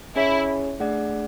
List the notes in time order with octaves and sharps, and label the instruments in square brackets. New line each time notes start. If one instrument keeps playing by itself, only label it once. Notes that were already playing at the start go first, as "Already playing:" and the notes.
[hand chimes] C#4 G#4 C#5 G#5 [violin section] E4
[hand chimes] A3 D4 G#4 D5 F#5